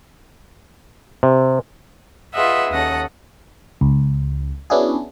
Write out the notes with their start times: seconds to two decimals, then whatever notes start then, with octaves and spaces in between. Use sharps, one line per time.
1.23 C3
2.34 F4 G#4 B4 D#5 E5 F#5
2.72 D#2 C#4 A4 F#5 D#6 A#6
3.81 C#2
4.70 B3 C#4 D4 E4 F#4 G#4